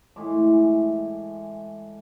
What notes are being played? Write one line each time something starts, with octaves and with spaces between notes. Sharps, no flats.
A2 E3 G#3 D6